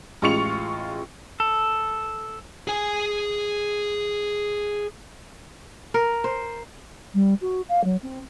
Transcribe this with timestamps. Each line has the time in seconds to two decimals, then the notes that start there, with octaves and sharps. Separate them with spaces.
0.22 A1 G#3 F4 C#6 C#7 F7
1.40 A4
2.67 G#4 G#5
5.94 A#4
6.24 C5
7.14 G3
7.41 F#4
7.69 F5
7.84 F#3
8.03 C4